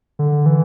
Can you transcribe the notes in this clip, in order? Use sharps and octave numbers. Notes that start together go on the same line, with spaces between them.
D3
E3